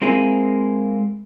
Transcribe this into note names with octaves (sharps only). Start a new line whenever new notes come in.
G#3 A#3 C4 E4 G#4